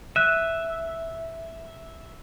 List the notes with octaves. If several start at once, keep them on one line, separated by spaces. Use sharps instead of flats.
E5 F#6 D#7